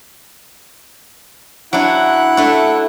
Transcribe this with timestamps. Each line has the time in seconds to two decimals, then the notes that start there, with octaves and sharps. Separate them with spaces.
1.73 F#3 D4 E4 F#5
2.37 A3 D4